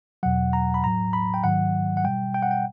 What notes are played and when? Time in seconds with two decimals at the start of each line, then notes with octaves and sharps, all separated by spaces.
0.23 E2 B2 F#3 F#5
0.53 A#5
0.74 B5
0.84 A2 F#3 A#5
1.13 B5
1.34 G5
1.44 G#2 D#3 F#3 F#5
1.97 F#5
2.04 B2 G3 G5
2.34 G5
2.42 F#5
2.51 G5